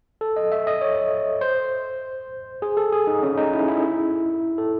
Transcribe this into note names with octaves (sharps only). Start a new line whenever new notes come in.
A4
D#5
E5
D#5
C#5
C5
G#4
A4
G#4
D#4
C#4
D#4
E4
E4
A4